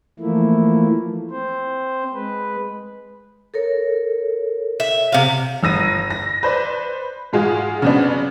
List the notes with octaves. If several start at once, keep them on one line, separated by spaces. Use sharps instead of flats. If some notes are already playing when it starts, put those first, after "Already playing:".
E3 F3 A3 A#3 E4
C4 C5
G#3 B4
A4 A#4 C#5
E5
C3 F5
G1 E6 A#6 D#7
A#6
B4 C5 D5
G#2 G#3 F4 F#4 G#4
C#3 F#3 B3 C4 D4